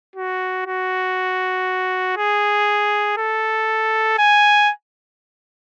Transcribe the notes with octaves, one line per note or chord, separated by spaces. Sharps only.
F#4
F#4
G#4
A4
G#5